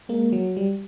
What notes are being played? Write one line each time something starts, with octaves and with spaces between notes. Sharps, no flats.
G#3 A#3
F#3
G3